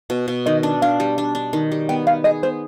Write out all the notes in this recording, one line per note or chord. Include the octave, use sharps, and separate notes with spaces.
B2
B2
D#3 D#5
D4
D4 F5
G3
D4
D4
D#3
G3
B3 G5
B3 F5
G#4 D#5
B3 C5